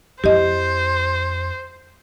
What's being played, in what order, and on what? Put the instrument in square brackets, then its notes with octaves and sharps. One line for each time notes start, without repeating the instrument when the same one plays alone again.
[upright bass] F2 E4 [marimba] G4 D#5 [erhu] C5